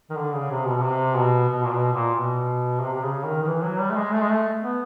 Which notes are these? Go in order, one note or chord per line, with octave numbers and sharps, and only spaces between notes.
D#3
D3
C#3
C3
B2
B2
C3
B2
B2
A#2
B2
A#2
B2
C3
C3
C#3
D#3
D#3
E3
F#3
G3
A3
G#3
A3
G#3
A3
B3